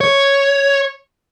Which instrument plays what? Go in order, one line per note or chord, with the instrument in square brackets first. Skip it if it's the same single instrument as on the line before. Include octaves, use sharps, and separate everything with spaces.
[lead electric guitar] C#5